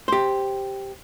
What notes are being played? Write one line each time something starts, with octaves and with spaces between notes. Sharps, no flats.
G4 C5